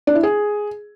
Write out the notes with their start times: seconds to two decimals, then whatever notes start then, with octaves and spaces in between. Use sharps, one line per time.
0.07 D4
0.15 E4
0.23 G#4